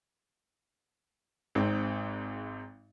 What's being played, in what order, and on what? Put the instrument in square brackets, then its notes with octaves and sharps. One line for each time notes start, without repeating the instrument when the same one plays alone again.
[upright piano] G#1 G#2 C4